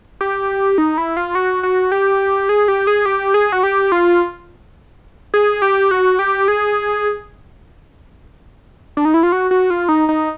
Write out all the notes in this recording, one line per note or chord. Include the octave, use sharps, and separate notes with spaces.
G4
D#4
E4
F4
F#4
F#4
G4
G#4
G4
G#4
G4
G#4
F#4
G4
F4
G#4
G4
F#4
G4
G#4
D4
D#4
E4
F4
F#4
F#4
F4
D#4
D#4